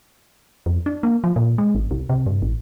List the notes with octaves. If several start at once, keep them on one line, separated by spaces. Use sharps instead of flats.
F2
D4
A#3
F3
A#2
G#3
G#1
C2
C3
G2
A1